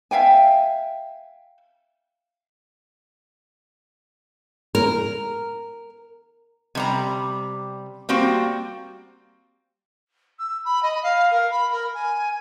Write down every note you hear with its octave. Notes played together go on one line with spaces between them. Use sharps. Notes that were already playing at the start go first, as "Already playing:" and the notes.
E5 F5 G5 G#5
A#4
C3 G3 A#5
G3 A#3 C4 F#4
E6
B5
D#5
F5
A#4
B5
A#4
G#5